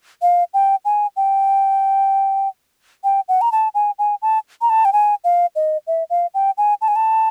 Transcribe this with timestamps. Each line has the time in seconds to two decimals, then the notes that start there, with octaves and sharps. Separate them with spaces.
0.22 F5
0.54 G5
0.85 G#5
1.16 G5
3.04 G5
3.28 F#5
3.41 A#5
3.52 A5
3.74 G#5
3.99 G#5
4.22 A5
4.61 A#5
4.70 A5
4.85 G5
4.93 G#5
5.24 F5
5.56 D#5
5.87 E5
6.10 F5
6.34 G5
6.58 G#5
6.81 A5
6.88 G#5
6.96 A5